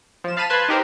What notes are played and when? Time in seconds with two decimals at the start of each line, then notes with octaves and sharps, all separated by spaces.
0.24 F3 E7
0.37 F5 A5 B5 F6 D#7 E7
0.50 B4 A5 B5 C6 F#6 G#6
0.69 D#4 G4 A#4 C5